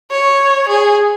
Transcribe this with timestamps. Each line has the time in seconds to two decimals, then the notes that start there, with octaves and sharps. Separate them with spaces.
0.11 C#5
0.68 G#4